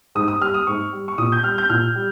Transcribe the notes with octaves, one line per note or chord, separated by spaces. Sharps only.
G#2 D#6
D#6
G3 F6
D#6
G#2 C#6
G3
C#6
A#2 D#6
G6
G3 F6
G6
A#2 F6
G3